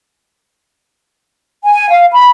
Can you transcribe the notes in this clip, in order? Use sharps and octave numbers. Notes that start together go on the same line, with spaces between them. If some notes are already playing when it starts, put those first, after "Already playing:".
G#5
F5
B5